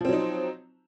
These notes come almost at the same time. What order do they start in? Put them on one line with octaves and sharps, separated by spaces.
F3 C4 F#3 D#4